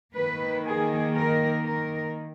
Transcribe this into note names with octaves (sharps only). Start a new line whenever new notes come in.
D#3 A#3 B4
G#4
A#4
A#4